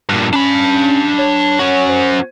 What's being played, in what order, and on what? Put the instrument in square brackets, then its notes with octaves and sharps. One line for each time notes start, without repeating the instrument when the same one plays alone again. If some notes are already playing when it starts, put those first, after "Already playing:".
[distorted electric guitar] G2 A#2
[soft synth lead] C#4 [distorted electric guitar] D4 B5
[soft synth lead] C#5
[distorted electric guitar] C#4 F#4 [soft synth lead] C#5
[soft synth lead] C5